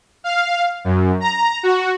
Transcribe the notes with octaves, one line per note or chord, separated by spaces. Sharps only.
F5
F#2
A#5
F#4